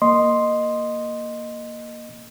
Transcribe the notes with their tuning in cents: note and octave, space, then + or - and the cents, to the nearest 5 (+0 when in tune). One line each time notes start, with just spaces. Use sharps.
A#3 +0 D#5 -10 C6 +0